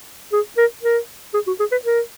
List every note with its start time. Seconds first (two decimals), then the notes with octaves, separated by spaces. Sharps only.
0.32 G#4
0.57 A#4
0.83 A#4
1.34 G#4
1.47 F#4
1.60 G#4
1.72 B4
1.85 A#4